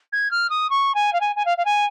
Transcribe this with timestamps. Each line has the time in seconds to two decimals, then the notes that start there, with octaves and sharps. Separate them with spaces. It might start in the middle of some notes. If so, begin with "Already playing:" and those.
0.12 G#6
0.31 F6
0.49 D#6
0.70 C#6
0.94 G#5
1.13 F5
1.20 G#5
1.36 G#5
1.45 F5
1.57 F5
1.65 G#5